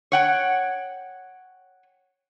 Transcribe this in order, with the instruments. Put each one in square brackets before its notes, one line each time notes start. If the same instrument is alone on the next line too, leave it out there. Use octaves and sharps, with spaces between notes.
[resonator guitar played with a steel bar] C#5 F#5 G5